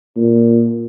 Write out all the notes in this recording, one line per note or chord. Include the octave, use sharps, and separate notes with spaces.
A#2